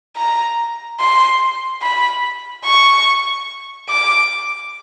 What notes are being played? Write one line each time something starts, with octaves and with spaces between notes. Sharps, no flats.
A#5
C6
B5
C#6
D6